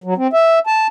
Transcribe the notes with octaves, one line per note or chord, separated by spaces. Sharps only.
F#3
C4
E5
A5